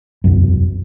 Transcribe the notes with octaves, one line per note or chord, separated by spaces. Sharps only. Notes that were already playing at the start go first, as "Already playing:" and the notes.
E1 C2 F#2